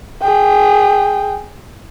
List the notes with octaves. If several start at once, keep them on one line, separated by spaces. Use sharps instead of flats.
G#4 G5